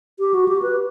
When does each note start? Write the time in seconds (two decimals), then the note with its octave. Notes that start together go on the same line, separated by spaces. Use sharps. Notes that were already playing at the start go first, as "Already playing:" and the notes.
0.19 G4
0.34 F#4
0.48 G4
0.62 B4